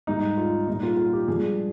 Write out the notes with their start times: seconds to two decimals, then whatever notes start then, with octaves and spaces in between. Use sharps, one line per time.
0.07 G#2 G3 D#4
0.37 F4
0.67 A#2 G3 D#4
0.83 F4
0.97 F4
1.13 G4
1.28 G2 F3 G#3 G#4